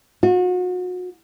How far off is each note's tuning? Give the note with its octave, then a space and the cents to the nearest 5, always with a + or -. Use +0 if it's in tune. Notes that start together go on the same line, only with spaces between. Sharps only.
F#4 -35